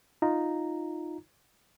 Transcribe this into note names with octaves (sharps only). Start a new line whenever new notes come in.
D#4 F4 A#5